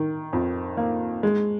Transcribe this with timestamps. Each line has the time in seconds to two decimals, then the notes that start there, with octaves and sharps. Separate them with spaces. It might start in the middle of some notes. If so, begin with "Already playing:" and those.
Already playing: D#3
0.33 F2
0.77 A#3
1.23 G#3